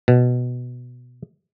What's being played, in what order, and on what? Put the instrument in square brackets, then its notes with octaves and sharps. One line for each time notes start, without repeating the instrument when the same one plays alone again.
[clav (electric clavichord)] B2